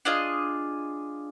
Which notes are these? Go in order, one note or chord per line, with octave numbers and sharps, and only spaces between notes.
D4 F4 G#4 D#5